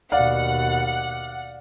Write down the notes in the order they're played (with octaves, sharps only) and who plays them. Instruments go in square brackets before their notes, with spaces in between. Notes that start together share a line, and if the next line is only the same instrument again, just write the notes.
[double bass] D#2 B2 [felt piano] D5 F5 [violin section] F#5